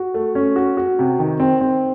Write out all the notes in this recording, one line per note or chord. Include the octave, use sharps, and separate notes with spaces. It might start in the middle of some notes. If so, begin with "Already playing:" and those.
Already playing: F#4
A3
C#4
F#4
F#4
C3
D#3
C4
C4